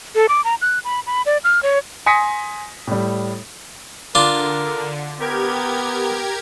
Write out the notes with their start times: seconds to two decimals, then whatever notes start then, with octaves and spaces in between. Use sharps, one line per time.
0.15 A4
0.29 D6
0.44 A#5
0.62 F#6
0.85 B5
1.07 B5
1.26 D5
1.44 F6
1.63 C#5
2.06 G#5 C6 D#6 A#6 B6 C#7
2.87 A2 G3
4.15 D3 D4 F4 A#4
5.20 B3 G4 A#4 G#6